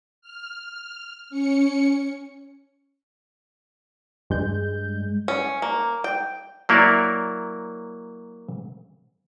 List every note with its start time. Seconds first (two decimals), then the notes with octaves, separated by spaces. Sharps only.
0.21 F6
1.30 C#4 C#7
4.30 G2 G#3 G6
5.28 C#4
5.62 A#3
6.04 G5
6.69 F#3 A#3 E4 A#4 C#5 D5